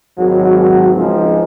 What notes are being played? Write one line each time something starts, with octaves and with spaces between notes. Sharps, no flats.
G#1 F#3
C#2 F3 G#3 C4 D#4